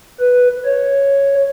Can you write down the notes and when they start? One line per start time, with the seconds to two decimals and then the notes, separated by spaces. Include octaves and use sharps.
0.20 B4
0.65 C#5